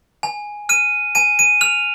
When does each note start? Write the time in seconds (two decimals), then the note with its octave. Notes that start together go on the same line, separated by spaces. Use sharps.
0.23 G#5
0.69 F6 D#7
1.15 G#5 D#7
1.39 D#7
1.61 F6 F7